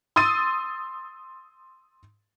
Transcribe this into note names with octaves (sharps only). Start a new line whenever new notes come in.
C6 D#6 E6 A6 D#7